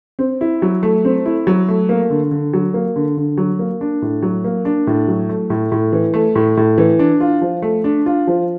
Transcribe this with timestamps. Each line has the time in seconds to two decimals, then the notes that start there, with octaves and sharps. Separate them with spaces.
0.19 C4
0.41 E4
0.62 F#3
0.83 A3
1.05 C4
1.26 E4
1.47 F#3
1.68 A3
1.89 A#3
2.10 D3
2.31 D3
2.53 F#3
2.74 A#3
2.96 D3
3.17 D3
3.38 F#3
3.59 A#3
3.81 D4
4.02 A2
4.23 F#3
4.44 A#3
4.65 D4
4.87 A2
5.08 F#3
5.29 A3
5.50 A2
5.72 A2
5.92 E3
6.14 A3
6.35 A2
6.57 A2
6.78 E3
6.99 D4
7.20 F4
7.42 F3
7.62 A3
7.84 D4
8.06 F4
8.27 F3